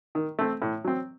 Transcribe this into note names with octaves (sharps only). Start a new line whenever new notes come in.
D#3
A3 C4
A2
F#3 C4